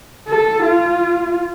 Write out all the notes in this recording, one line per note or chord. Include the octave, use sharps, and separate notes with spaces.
A4
F4